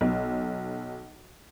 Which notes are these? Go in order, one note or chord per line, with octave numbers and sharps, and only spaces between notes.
B1